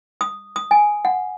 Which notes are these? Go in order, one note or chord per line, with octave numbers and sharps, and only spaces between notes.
D#6
D#6
G#5
F#5